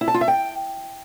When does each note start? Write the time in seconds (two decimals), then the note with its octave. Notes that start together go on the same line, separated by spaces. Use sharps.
0.01 E4
0.08 A5
0.14 F4
0.21 E5
0.28 G5